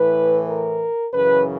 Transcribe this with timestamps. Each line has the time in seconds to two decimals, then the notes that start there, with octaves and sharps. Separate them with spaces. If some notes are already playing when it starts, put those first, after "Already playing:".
Already playing: A2 E3 B4
0.47 A#4
1.14 F#2 C#3 E3 B4